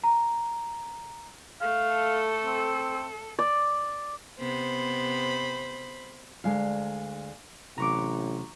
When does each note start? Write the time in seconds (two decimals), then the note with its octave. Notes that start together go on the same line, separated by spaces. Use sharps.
0.04 A#5
1.61 A3 F5
1.93 A4
2.44 C4
3.39 D5
4.39 C3 B3 C5 B5
6.44 D2 G#3 F5
7.78 A1 C3 F#3 A#5 C#6 D6